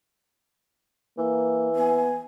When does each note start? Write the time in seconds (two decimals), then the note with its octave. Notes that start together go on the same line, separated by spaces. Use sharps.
1.18 E3 A#3
1.76 B3 G#5